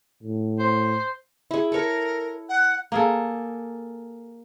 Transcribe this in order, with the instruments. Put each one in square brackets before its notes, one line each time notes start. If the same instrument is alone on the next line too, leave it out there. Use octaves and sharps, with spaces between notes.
[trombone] A2
[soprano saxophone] C5
[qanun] E4 G#4
[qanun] A4 C#5 [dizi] A#4
[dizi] F#5
[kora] A#3 G#4 A4